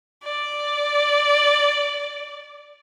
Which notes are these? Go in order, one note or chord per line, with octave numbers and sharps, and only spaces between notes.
D5